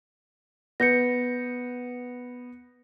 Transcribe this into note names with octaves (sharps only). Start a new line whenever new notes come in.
B3 G6 A#6 C#7